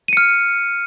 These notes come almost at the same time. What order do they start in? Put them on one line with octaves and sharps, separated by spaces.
D#7 C#7 F6